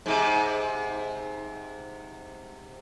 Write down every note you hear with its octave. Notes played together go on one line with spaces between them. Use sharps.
G#2 C3